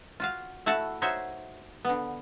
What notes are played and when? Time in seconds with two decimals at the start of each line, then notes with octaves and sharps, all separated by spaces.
0.20 F4 F#4 F5
0.66 A3 E4 F#4 F#5 A5
1.02 D#4 F#4 C5 C#5 E5
1.85 D3 B3